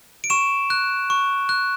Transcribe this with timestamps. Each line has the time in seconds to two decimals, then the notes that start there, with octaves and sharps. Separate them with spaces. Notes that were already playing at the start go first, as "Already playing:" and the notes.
0.24 D7
0.30 C#6 E7
0.70 F#6
1.10 C#6
1.49 F#6